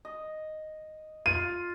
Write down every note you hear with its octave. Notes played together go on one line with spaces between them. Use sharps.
D#5
F4 D#7